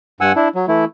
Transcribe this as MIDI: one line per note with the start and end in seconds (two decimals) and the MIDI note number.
0.21 0.32 43
0.21 0.32 78
0.21 0.32 80
0.21 0.32 88
0.36 0.48 62
0.36 0.48 64
0.55 0.66 54
0.68 0.85 52
0.68 0.85 57
0.68 0.85 64